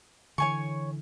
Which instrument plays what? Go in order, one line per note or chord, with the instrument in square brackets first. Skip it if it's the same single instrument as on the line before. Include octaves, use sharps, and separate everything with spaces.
[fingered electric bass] D3 E3 [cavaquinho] C#5 G#5 C#6